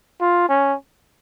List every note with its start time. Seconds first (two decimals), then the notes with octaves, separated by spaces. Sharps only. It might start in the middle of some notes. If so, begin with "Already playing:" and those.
0.21 F4
0.49 C#4